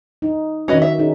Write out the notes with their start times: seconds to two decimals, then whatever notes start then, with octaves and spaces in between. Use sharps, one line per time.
0.22 D#4
0.68 D#3 C#4 F#4 B4 D#5
0.82 E5
0.99 C#4 D#4 G#4